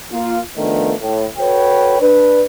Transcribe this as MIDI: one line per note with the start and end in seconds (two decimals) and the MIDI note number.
0.12 0.39 58
0.12 0.39 65
0.57 0.93 51
0.57 0.93 53
0.57 0.93 57
0.57 0.93 59
0.57 0.93 62
1.01 1.25 45
1.38 1.98 66
1.38 1.98 69
1.38 1.98 71
1.38 1.98 73
1.38 1.98 79
2.00 2.44 62
2.00 2.44 71